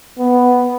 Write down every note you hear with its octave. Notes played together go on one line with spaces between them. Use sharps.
B3